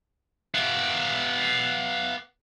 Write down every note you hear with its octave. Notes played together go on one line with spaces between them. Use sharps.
B3 G4 F5 F#5